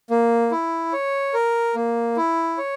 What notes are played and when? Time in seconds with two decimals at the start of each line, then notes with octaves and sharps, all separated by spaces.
0.10 A#3
0.51 E4
0.93 C#5
1.34 A#4
1.75 A#3
2.17 E4
2.58 C#5